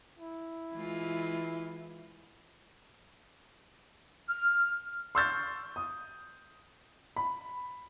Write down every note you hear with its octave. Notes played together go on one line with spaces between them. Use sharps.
E4
E3 G#3 F4
F6
C6 C#6 E6 F6 G6 A6
D#6
B5